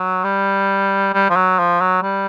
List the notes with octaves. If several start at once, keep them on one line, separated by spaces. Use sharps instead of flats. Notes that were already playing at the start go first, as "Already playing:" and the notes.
Already playing: F#3
G3
G3
F3
F#3
F3
F#3
G3